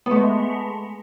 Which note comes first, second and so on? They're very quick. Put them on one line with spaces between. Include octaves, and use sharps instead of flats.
B3 A3 G#3